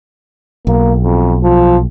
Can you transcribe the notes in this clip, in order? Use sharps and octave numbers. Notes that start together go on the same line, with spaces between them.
B1 A#3
F2
F3